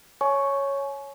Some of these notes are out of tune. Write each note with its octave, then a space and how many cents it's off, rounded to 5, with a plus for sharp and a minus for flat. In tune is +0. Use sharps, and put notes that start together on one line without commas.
C#5 -5 G#5 +30 C#6 +0